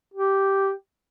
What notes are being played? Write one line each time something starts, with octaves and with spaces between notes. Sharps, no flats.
G4